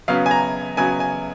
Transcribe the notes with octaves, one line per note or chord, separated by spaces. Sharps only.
C#3 F#3 B3 F5
G#5
A#5
C#3 F#3 B3 G#5
G#5